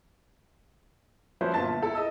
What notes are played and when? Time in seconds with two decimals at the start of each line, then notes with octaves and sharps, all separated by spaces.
1.41 F3 F#3 C#4 B4 C5
1.54 G1 A#2 F4 A5 A6
1.82 E4 A4
1.95 A4 D#5 E6